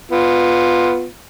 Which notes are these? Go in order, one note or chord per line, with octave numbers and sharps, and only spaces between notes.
B3 F4